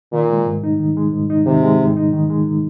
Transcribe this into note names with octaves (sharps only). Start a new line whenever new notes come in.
A#2 D#3
G#3
G#2
D#4
D#3
G#3
G#2
D#4
C3 D#3
G#3
G#2
D#4
D#3
G#3